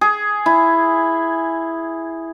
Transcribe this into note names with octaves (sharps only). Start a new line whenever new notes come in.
G#4
E4